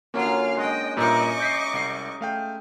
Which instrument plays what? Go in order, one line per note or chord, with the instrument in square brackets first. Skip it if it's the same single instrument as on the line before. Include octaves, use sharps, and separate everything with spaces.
[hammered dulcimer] D3 F#3 C#4 [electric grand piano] A#3 [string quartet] F4 F5
[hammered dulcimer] G#3 [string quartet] D#5 G5
[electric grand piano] G2 A#2 [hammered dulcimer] D#4 E5 [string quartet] D#5 C#6 D6
[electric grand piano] G6 B6 C7
C2 C7
A3 F5 G5